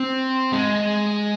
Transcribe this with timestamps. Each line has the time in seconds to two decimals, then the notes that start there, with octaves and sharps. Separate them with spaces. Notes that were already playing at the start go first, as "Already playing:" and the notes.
Already playing: C4
0.52 G#3